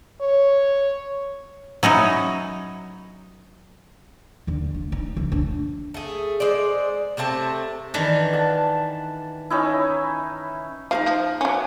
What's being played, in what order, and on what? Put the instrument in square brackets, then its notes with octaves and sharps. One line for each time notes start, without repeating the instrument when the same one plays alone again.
[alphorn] C#5
[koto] F#3 C#4 D#4 E4
[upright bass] D#2 D3
A3
D#4
C#2 F3
A3 D4
[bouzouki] A3 G#4
G#3 C5 D5
C3 A3 C4 A5
[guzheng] D#3 E3 D4
[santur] F#5 A5
C#4 D#4 E4
[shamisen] F3 [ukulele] D#4 F#4 F5
[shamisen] F3
F#3 C#4